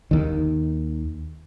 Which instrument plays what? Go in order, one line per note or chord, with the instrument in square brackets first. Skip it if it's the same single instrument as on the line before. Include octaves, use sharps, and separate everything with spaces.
[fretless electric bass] D#2 D#3